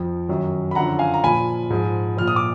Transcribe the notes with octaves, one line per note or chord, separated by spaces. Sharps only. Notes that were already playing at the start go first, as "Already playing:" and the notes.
Already playing: F2 F3
F#2 D#3 F#3
B5
F#2 D3 F3 F#5 A#5
F5 G#5
A#5
A#2 F3 G#5 B5
G#2 F3
A#2 F3 F6
D#6
D6